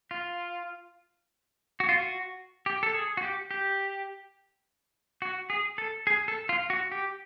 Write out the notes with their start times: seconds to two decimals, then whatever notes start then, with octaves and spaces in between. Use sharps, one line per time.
0.11 F4
1.80 F#4
1.89 F4
1.96 F#4
2.66 G4
2.83 A4
2.94 G#4
3.17 F#4
3.23 G4
3.51 G4
5.22 F#4
5.50 G#4
5.78 A4
6.07 G#4
6.28 A4
6.49 F4
6.70 F#4
6.92 G4